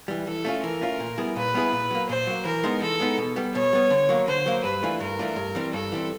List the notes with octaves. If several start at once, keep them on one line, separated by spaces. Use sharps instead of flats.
E3 G3
E3 A4
A3 C#4 F4
E3 A#4
A3 C#4 F4
A#2
G3 B3 E4 G#4
A#2 B4
G3 B3 E4 G#4
A#2
F#3 A#3
A#2 C5
F#3 A#3
E3 A#4
G#3 B3 D#4
E3 A4
G#3 B3 D#4
B2
G3 B3
B2 C#5
G3 B3
D3
F#3 A#3
D3 C5
F#3 A#3
G2 B4
E3 A3 D4 F4
G2 A#4
E3 A3 D4 F4
G2
E3 G3 C4
G2 A4
E3 G3 C4